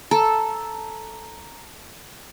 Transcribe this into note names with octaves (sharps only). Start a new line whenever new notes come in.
A4 A#5